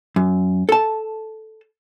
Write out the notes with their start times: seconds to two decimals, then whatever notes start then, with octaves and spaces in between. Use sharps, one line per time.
0.16 F#2
0.69 A4 A5